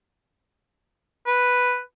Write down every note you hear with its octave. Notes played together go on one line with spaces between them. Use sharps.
B4